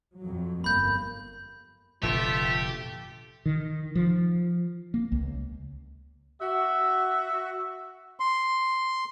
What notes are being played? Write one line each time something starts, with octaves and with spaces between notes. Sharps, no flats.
F2 F#3
G1 A#3 B5 G6
F1 A#2 D3 A3 F4 G4
D#3
F3
A#3
C#2
F#4 E5
C6